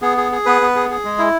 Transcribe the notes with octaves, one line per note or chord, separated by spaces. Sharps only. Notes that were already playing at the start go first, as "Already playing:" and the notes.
B3 G#4
G#4
G#4
B3 B4
B3
G#4
G#4
G#3
E4